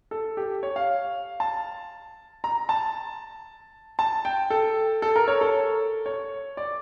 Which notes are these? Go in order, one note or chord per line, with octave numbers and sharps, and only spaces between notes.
A4
G4
C#5
F5
A5
A#5
A5
A5
G5
A4
A4
A#4
C#5
A4
C#5
D5